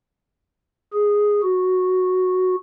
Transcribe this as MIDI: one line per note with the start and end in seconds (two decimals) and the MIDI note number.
0.93 1.41 68
1.43 2.55 66